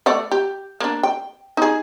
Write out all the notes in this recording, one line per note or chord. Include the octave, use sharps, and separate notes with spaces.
A3 D5 F#5
G4
A#3 D4
G5
D#4 G#4